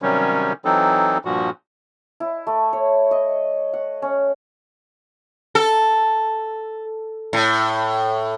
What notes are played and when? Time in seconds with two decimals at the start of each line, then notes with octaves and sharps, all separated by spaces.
0.02 C3 D#3 F#3 G3 C#4
0.65 E3 F#3 C4 D#4 A4
1.25 G2 A#2 F3 F#4
2.20 E4
2.47 A3
2.73 C#5
3.11 D#5
3.74 F#5
4.02 C#4
5.55 A4
7.33 A2